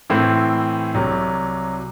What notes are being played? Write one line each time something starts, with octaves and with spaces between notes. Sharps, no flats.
A2 E3 C4 E4
C2 C3 F#3